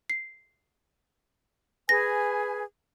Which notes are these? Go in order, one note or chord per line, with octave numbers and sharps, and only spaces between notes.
C7
G#4 B4 G#5 A#6